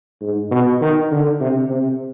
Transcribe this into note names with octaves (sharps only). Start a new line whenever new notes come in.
G#2
B2
D#3
D3
C3
C3